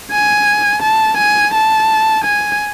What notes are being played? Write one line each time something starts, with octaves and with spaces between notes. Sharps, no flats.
G#5
A5
G#5
A5
G#5